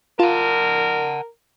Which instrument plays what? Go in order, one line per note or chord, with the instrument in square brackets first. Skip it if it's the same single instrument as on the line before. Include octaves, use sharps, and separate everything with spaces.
[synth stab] F4 [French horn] A#4 [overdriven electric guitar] F#5 A5